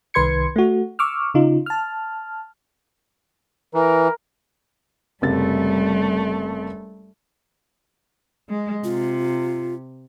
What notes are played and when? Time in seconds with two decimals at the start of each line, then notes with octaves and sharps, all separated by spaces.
0.14 C2 D#3 B4 C6 G#6 C#7
0.56 A3 F#4
0.99 C#6 D6 E6 F6
1.34 C#3 D#4 F4
1.66 A5 F6
3.74 E3 A#4
5.22 F#1 C3 G3 A3 A6
8.49 G#3
8.84 C3 F4